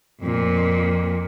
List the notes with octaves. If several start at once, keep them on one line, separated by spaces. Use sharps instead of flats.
F2 A#2